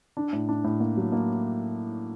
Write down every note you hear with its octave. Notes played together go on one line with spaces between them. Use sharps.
D4
A2
D4
A2
A#3
F#3
A#3